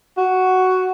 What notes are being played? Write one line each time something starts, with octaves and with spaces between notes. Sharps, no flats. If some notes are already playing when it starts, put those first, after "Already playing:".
F#4